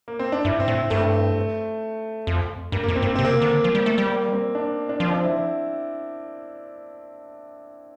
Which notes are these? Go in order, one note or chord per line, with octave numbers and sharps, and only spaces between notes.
A#3
C4
D4
G2 E4
C4
A2
G2 A3
F2
G2 A#3
A#3
F2
C4
G2
A#3
C3 C4
A#3
D3
F3
G3
A3
G3
A#3
C4
D4
D4
F3 C4
D4
E4